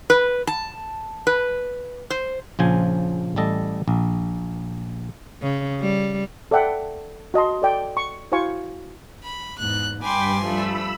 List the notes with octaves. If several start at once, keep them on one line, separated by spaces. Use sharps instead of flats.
B4
A5
B4
C5
A#1 C#3 F3 C5 G#5
A1 G3 A4 D#5
A#1
C#3
G3
A4 D5 E5 F#5 G5
F#4 D#5 A5 C6
A4 D5 G5
C#6
E4 F#4 C5 F5 G#5 C#6
B5
E2 G#2 F#6
G2 G5 G#5 B5 C6 D6
F3 G3 A3 B5 E6